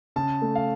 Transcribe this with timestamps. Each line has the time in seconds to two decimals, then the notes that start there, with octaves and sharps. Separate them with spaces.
0.16 C#3 A5
0.42 A3
0.55 F5